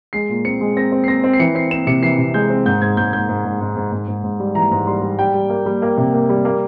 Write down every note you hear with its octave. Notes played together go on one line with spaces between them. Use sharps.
G#3 C7
A#2
C4 C#7
G#3
C4 A#6
C4
C7
C4 A#6
C4
C7
E3 C#7
C4 C7
C4 E7
C3 C#7
E3 C7
C3
G#3 G6
C4
G#2 G6
G#2 G#6
G#2 G6
G#2 G6
G#2
G#2
G#2
G#2
G#2
G#2
G#2
G3
E3 A#5
G#2 A#5
G3 C6
G3
G3 G5
G3
A#3
G3
A#3
C3
A#3
G3
A#3